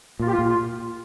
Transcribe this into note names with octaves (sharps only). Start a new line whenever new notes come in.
A#2 F4
G4
F4
A#2
F4